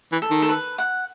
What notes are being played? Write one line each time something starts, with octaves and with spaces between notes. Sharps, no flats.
E3
A4
D#3
A4
B4
F#5